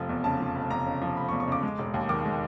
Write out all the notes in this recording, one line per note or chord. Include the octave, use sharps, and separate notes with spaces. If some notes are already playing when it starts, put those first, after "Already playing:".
Already playing: F1 F3
E2
C#3 A5
F3
F1
E2 A#5
C#3
F3
F1 B5
C#6
E2
C#6
C#3 D6
G#3
E1
D#2
D#3 D6
G#3